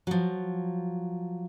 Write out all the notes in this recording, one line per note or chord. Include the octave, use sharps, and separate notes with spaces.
F3 F#3